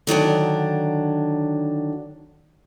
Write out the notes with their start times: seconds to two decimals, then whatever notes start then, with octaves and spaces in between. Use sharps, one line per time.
0.07 D3 D#3 F#3 D4